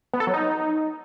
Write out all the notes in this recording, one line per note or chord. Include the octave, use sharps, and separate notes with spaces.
B3
A4
F#3
D#4